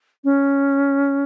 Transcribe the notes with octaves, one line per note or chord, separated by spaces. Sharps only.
C#4